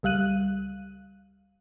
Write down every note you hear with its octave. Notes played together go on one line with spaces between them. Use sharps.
C#2 G3 F5 F#6 D#7